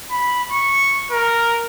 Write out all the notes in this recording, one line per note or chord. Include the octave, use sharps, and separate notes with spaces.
B5
C#6
A#4